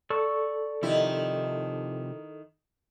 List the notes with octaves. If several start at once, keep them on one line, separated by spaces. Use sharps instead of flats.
A4 D5 C#6 E6
C3 D#3 F3 E4 G4